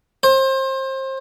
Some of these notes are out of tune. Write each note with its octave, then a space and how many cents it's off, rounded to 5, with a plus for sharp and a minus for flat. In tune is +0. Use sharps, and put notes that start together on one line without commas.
C5 +30